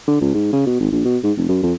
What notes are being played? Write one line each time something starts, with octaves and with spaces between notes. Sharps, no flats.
D3
C#2
G#2
C#3
B2
G#1
A#1
B2
G#2
F1
F#2
F2